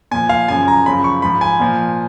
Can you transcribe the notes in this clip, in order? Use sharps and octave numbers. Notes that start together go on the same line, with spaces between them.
A#2 F3 G#5
F5
F#2 C#3 F3 G#5
A#5
F#2 C#3 F3 B5
C#6
G#2 F3 B5
G#5
A#2 F3